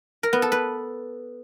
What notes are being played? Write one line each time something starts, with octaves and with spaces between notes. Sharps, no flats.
A#4
B3
A4
B4